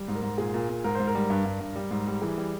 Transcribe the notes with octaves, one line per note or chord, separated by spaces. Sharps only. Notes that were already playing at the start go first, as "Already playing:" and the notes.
Already playing: G3
G#2
A#4
G#2
A#2 G#4
A#2
A#2
G#2 A#4
G#2 C5
A#4
G3
G2
G2
G2
G3
G#2
G3
E3 G#4
G3